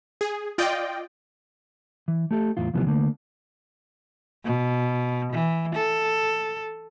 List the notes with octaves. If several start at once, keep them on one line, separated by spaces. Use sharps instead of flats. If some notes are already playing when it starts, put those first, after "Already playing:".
G#4
F4 D5 D#5 G5
E3
A3 G4 A4
E2 A2 F4
D#2 C3 E3 F3 G3 B3
D3 A3 A#3
B2
E3
A4